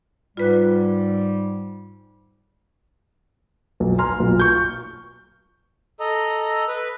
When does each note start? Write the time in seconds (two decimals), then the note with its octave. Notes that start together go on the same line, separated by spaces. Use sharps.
0.37 G#2 G3 F4 B4 F#6
3.80 B1
3.98 G#5 A#5 C6 F6
4.20 B1 A#2
4.40 C#6 G6
6.00 A4 D#5 A#5
6.68 B4